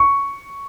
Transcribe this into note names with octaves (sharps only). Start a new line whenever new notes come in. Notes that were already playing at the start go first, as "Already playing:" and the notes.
Already playing: C#6